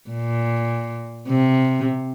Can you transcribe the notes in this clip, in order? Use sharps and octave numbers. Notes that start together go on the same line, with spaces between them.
A#2
C3